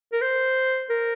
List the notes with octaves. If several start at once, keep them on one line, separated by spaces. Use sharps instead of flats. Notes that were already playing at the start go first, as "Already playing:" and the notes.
A#4
C5
A#4